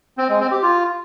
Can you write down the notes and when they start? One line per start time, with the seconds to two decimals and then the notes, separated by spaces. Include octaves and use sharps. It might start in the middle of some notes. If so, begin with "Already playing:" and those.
0.18 C4
0.29 G#3
0.40 C4
0.51 G4
0.62 F4